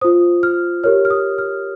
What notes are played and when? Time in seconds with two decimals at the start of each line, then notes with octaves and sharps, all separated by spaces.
0.01 F4 C5 D#6
0.43 F6
0.83 G4 A#4 C#5 F6
1.05 F6
1.10 D#6
1.38 F6